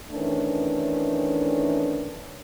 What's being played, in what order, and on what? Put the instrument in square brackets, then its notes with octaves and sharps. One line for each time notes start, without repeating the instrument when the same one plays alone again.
[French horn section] D#3 E3 A3 C#4 D4